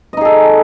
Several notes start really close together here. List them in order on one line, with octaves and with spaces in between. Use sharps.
D#5 D#4 G#4 A4